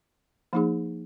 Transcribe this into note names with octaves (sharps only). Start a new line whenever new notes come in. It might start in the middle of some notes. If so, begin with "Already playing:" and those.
F3 A#3 D#4 G#4